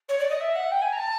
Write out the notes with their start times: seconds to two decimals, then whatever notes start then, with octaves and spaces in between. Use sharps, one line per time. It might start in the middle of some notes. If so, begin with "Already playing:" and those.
0.09 C#5
0.19 D5
0.29 D#5
0.40 E5
0.55 F#5
0.71 G5
0.81 G#5
0.92 A#5
0.97 A5